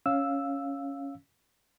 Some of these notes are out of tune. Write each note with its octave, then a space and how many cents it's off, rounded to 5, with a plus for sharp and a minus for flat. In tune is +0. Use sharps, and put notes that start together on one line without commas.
C#4 +0 F5 +0 E6 +0